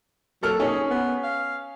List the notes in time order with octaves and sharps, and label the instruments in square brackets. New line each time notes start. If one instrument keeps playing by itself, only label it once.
[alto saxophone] F#3 [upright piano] A#3 A4 F6
[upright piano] C#4 G#4 [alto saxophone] D#4
[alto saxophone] B3
F5